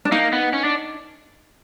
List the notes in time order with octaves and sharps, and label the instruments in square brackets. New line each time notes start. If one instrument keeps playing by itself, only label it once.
[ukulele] D4
[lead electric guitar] A#3 [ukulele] D#4
[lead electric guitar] B3
C#4
D4